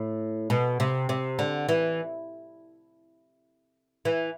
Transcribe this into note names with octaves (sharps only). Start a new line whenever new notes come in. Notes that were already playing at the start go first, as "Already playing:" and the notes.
Already playing: A2
B2
C3
C3
D3
E3
E3